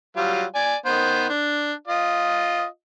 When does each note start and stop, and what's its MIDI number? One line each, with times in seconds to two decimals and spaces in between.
0.17 0.44 54
0.17 0.44 55
0.17 0.44 65
0.55 0.76 74
0.55 0.76 80
0.86 1.27 51
0.86 1.27 59
0.86 1.27 72
1.30 1.73 62
1.88 2.65 65
1.88 2.65 75